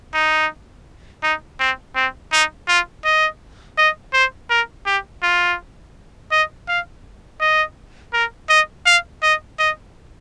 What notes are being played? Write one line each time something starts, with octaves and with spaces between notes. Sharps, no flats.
D#4
D#4
C4
C4
D#4
F4
D#5
D#5
C5
A#4
G4
F4
D#5
F5
D#5
A#4
D#5
F5
D#5
D#5